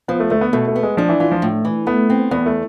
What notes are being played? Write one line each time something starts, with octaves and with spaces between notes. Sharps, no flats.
F3 B3
A3
D2 A3
B3
B2 A3
A3
B3
G#3
F3 D4
E3
E3 F4
F3
A2
E3
A3 B3
C4
E2 B3
A3